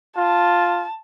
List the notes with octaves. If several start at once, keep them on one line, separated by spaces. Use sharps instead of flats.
F4 A5